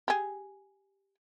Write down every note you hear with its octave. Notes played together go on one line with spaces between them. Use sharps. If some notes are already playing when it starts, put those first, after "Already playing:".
G4 G#4